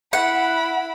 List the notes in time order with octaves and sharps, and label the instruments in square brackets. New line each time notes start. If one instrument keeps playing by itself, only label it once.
[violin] E4 B5 [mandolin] F#5